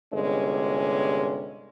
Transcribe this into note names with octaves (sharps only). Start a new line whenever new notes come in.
G1 C3 G#3 C#4